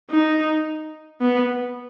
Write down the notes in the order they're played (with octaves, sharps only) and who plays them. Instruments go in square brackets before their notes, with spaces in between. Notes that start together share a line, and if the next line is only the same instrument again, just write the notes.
[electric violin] D#4
B3